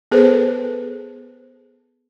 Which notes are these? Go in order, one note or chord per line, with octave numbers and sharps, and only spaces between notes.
B3 G#4 A4 B4 C5